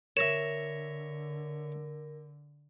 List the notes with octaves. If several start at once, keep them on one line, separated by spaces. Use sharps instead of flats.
D3 A#4 C#5 E5 A#6 E7